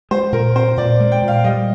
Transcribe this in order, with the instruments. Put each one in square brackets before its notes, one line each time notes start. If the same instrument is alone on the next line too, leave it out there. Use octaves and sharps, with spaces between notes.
[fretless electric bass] G#3 [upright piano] C5
[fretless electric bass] A#2 [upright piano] A#4
[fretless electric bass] C4 [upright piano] C5
[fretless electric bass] A#2 [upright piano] D5
[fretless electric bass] G#3
[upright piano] G5
[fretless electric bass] A#2
[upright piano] F5
[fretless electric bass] G3 [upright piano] D#5